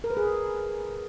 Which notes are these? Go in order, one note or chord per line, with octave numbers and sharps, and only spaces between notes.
A#4
B4
G#4